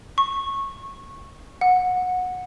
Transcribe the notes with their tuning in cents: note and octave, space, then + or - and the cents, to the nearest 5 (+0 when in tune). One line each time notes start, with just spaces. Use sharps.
C#6 -20
F#5 -20